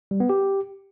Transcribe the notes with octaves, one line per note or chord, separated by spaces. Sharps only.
G3
B3
G4